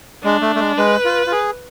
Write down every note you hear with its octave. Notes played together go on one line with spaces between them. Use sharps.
G#3 D4
A3
A3
G#3
G#3 B4
F4
F4
G#4